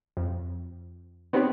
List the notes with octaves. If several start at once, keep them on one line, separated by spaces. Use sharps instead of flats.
F2
B3 C4 D#4 G4 B4 C#5